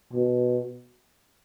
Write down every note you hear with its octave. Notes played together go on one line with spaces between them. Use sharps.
B2